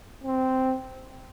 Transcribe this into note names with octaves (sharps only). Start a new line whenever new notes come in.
C4